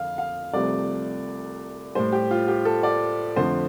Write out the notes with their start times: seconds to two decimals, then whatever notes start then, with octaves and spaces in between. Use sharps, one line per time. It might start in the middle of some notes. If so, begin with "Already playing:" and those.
Already playing: F2 D3 F5
0.18 F5
0.53 C2 C3 F3 A3 D5
1.95 A2 G3 C5
2.12 G4
2.31 F4
2.48 G4
2.65 A4
2.83 D5
3.36 F2 D3 F3 A3 C5